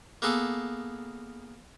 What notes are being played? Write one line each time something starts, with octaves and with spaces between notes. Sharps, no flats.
A#3 B3 G#4 A4